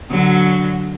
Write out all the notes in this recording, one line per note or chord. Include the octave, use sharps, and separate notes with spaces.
D3 F#3